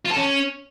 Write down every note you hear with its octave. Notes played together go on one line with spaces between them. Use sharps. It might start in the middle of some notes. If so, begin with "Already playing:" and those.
F4
A4
C#4